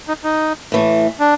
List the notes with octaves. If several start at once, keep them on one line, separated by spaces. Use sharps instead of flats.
D#4
D#4
A2 E3 A3
D4